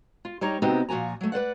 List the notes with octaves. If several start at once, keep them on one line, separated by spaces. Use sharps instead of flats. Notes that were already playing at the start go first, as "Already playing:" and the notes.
F4
G3 D#4 C#5 A#5
C3 B3 C4 D#4 F#4 G4
A#2 F3 F#4 G#5 A#5
F#3 A3
B4 C5 D5 F#5